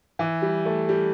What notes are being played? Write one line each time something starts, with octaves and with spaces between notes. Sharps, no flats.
E3
G3
A3
G3